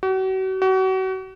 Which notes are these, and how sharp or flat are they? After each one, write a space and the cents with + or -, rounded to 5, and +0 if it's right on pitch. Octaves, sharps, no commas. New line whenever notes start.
F#4 +40
F#4 +35